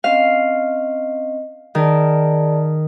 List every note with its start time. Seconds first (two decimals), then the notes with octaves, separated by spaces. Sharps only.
0.04 C4 C#4 D#5 F5
1.75 D#3 G#4 D5 A5